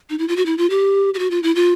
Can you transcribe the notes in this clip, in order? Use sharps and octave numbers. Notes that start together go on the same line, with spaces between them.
D#4
E4
F4
F#4
E4
F4
G4
G4
F#4
F4
E4
F4